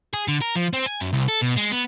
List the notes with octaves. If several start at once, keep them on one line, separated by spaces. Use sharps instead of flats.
G#4
D3
A#4
F3
C4
G#5
F#2
C2
A4
B2
G#3
B3